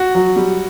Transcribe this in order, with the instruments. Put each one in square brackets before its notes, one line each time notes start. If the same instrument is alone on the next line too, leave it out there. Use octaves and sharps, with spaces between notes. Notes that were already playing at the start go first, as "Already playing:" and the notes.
Already playing: [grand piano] F#4
F#3
G3